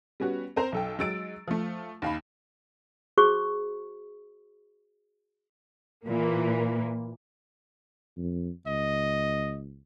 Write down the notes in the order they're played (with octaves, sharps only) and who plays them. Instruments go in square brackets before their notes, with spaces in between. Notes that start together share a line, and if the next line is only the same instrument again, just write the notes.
[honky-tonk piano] G3 B3 C#4 F#4
C4 A#4 C5 A#5
B1 A4 G5
F#3 G#3 E6 A6 D7
F3 A3
D#2 F5 B5
[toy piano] F#4 G#4 C5 C#6
[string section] A#2 E3 A#3
[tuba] F2
[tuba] C#2 [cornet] D#5